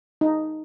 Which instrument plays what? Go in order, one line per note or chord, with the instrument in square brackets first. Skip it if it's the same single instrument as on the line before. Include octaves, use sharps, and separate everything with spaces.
[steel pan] D#4